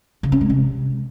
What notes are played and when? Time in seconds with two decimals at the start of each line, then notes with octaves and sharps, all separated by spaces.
0.23 C#3
0.32 C#4
0.41 G#3
0.50 C3